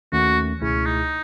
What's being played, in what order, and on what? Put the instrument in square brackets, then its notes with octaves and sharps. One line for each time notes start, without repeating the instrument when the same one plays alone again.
[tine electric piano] D#2 D#3 A3 C#4 [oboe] F#4
[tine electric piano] C#2 B2 A3 E4 G#4 [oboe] C#4
[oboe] D#4